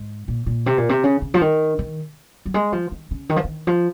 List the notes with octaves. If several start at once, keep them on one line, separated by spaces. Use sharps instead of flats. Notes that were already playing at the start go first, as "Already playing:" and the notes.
Already playing: G#2
A#2
A#2
C3
A#2
C3
C#3
C#3
F3
D#3
D#3
F#3
G#3
F3
D#3
C#3
D#3
F3
D#3
F3